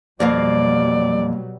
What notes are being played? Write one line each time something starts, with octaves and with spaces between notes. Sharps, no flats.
F2 B2 F#3 G3 A#3 D5 F5